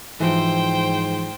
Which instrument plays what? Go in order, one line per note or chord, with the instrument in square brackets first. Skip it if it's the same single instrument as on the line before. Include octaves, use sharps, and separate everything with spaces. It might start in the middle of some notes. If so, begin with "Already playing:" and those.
[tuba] G#2 [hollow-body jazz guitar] E3 F3 [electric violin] C5 G5